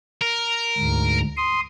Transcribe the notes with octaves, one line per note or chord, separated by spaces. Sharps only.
A#4
D2 G#2
C6 D#6